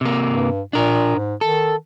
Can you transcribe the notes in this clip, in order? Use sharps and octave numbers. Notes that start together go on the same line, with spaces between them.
C3 A#3
G2
A#2 D4 A#4
G#2
D#3 A4